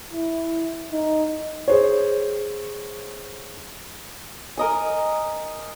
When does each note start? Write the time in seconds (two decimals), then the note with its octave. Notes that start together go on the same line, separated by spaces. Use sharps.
0.13 E4
0.92 D#4
1.68 G#4 C5 C#5
4.58 A#4 D#5 G#5